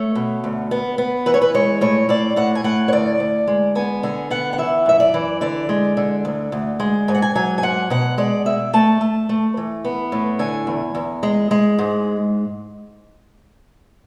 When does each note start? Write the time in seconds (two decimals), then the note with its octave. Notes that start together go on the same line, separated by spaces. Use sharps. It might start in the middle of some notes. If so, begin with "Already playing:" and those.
Already playing: A3 C#5
0.15 B2
0.44 D2
0.71 B3
0.98 B3
1.26 E3 B4
1.34 C#5
1.42 B4
1.55 G#3 C#5
1.81 A2 C#5
2.09 A2 D5
2.36 A2 F#5
2.55 G#5
2.64 A2 F#5
2.88 C#5
2.92 D2 D5
3.20 D2
3.47 G#3
3.75 B3 G#5
4.03 D3 G#5
4.30 B3 F#5
4.53 F#5
4.58 E3 E5
4.86 F#2 E5
5.00 D5
5.14 E3
5.41 D3 D5
5.69 G#3
5.97 D3
6.25 D2
6.52 D2
6.80 G#3
7.08 G#2 G#5
7.15 F#5
7.22 G#5
7.35 F#3 G#5
7.58 G#5
7.63 G#2 F#5
7.90 B2 F#5
8.18 G#3 D5
8.45 B2 E5
8.73 A3 A5
9.01 A3
9.29 A3
9.57 E3
9.85 B3
10.12 A2
10.39 D3 G#5
10.67 E2
10.95 E2
11.23 G#3
11.51 G#3
11.79 G#2